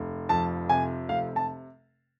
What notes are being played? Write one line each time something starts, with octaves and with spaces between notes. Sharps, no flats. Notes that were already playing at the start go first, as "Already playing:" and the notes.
Already playing: F1
F2 A5
C3 G#5
F1 F5
A5